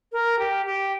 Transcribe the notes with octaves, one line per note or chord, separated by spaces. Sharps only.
A#4
G4
G4